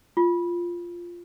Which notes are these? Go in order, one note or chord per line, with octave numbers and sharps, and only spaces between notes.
F4